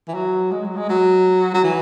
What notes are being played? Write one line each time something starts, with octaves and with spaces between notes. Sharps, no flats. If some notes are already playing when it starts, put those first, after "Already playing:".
E3
F#3
G#3
F#3
G#3
F#3
F#3
E3